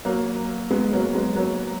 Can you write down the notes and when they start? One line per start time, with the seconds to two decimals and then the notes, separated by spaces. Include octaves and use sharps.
0.05 F#3 A#3
0.71 G#3 B3
0.93 F#3 A#3
1.15 G#3 B3
1.36 F#3 A#3